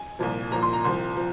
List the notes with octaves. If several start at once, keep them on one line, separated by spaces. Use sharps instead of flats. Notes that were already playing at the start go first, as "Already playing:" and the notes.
Already playing: G#5
C2 A#2 F3
C2 A#2 F3 A#5
C6
A#5
C2 C3 F3 C6
F3